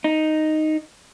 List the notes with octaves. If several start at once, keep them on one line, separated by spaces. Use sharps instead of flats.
D#4